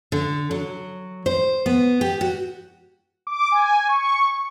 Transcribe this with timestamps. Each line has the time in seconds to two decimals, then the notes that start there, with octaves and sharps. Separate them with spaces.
0.12 D3
0.51 F#3
1.26 C5
1.66 B3
2.01 G4
2.21 F#4
3.27 D6
3.52 G#5
3.89 C#6